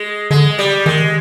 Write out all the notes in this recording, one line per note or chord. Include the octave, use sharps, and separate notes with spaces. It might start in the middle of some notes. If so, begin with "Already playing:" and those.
Already playing: G#3
D3 G#3
G3
D#3 G#3